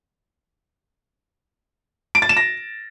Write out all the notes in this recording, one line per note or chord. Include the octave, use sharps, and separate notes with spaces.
D7
A6
E7
A#6